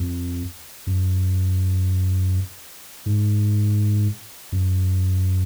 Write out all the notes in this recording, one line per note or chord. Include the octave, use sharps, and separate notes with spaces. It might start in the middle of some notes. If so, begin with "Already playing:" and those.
Already playing: F2
F#2
G#2
F#2